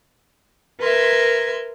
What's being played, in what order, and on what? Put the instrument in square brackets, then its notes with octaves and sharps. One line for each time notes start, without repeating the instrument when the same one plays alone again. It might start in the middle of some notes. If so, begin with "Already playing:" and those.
[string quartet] A#4 B4 E5 C6 G#6